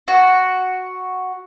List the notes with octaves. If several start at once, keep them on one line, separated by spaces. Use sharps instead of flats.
F#4